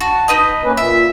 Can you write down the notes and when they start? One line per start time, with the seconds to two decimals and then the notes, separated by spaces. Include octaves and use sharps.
0.01 F#4 A5
0.28 D#4 B4 D#5
0.63 A#3 C#4 B4
0.77 A#2 E5